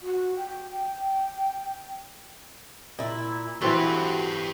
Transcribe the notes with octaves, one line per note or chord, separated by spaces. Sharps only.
F#4
G5
A#2 E4
E3 C4 F#4 G4 A4 B4